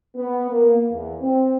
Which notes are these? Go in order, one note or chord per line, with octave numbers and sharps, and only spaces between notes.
B3
A#3
E2
C4